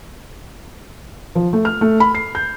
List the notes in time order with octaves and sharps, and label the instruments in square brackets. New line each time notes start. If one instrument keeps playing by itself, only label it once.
[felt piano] F3
A3
F6
A3
B5
C7
G6